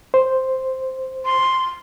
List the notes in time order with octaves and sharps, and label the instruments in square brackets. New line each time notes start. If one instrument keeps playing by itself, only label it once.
[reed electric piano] C5
[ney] C6